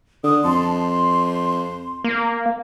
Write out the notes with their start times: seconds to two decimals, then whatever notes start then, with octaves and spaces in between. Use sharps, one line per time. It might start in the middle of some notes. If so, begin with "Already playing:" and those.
0.23 D3 D#6
0.44 F2 A5 C6
0.70 C6
2.04 A#3